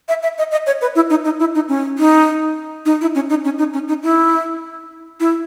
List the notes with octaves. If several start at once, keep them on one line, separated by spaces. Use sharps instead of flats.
E5
E5
D#5
D#5
C#5
B4
E4
D#4
D#4
E4
D#4
C#4
D#4
D#4
E4
C#4
D#4
C#4
D#4
C#4
D#4
E4
E4